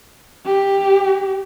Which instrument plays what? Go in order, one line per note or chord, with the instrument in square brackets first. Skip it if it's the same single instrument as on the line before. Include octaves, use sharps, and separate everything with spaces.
[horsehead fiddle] G4